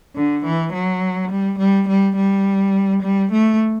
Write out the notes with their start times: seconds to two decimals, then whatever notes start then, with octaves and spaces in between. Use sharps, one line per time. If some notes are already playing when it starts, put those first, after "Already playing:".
0.16 D3
0.45 E3
0.73 F#3
1.31 G3
1.59 G3
1.89 G3
2.16 G3
3.03 G3
3.32 A3